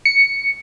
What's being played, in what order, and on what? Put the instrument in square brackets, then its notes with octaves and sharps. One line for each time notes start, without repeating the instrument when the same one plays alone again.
[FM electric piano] C#7